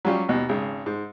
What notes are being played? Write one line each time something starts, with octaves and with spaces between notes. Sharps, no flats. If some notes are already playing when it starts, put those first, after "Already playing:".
F#3 G3 C#4 F4 G4
D#2 B2
G#1 C#3
G#2